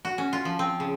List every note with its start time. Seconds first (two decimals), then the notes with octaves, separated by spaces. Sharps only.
0.05 F#4
0.18 C#4
0.33 F4
0.45 F3
0.59 C4
0.80 C#3